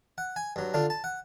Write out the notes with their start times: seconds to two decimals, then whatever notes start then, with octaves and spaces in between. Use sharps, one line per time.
0.18 F#5
0.36 G#5
0.56 G2 F#3
0.74 D3 D4 F4
0.90 A5
1.04 F#5